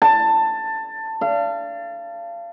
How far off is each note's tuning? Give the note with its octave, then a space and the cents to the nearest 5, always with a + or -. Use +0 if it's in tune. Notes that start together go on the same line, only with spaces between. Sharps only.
A5 +15
F5 -30